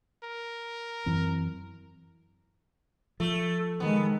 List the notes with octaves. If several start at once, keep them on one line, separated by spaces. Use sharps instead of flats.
A#4
F#2 E3 C4
F3 A3
D#3 G#3 B3